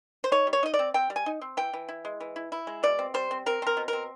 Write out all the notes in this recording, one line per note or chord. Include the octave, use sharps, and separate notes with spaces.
C5
D#4 C#5
G3
C#5
D#4 D#5
D5
C4
C4 G5
G3
G#5
D#4
C4
E3 G5
E3
E4
G#3
E3
E4
E4
G#3
B2 D5
C4
G3 C5
C4
C4 A#4
C4 A#4
B2
A#4
C4